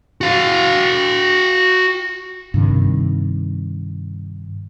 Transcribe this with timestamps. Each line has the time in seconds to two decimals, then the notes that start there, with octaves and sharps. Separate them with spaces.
0.21 F#4 F5
2.54 G2 C3 D#3